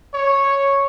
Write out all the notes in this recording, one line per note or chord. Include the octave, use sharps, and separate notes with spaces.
C#5